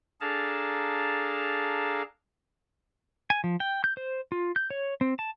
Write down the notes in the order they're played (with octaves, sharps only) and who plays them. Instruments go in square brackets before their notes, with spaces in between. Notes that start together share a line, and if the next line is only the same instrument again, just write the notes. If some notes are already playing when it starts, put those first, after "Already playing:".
[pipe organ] D4 G#4 A4 F5 A5 A#5
[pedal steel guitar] G#5
F3
G5
G6
C5
F4
G6
C#5
C4
A5